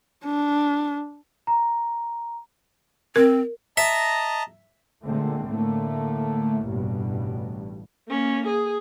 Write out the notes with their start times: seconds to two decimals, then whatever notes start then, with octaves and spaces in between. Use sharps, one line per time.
0.25 D4
1.47 A#5
3.16 C4 A#4
3.77 D#5 E5 A5 A#5
5.04 A#2 D3 G#3 A3 C4
5.46 A2 D3 A3 A#3
6.67 A1 G2 B2
8.08 A#3 C#4
8.47 G#4